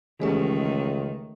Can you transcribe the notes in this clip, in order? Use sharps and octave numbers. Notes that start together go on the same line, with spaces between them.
C#2 D#3 E3 G#3 A3 C#4 G4 A4